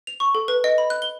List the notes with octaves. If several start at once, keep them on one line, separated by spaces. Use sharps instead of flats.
F7
C#6
A4
B4
D#5
B5
F#6
G7